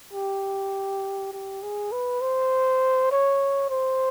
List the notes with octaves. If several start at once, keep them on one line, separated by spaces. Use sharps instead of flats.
G4
G4
G#4
B4
C5
C#5
C5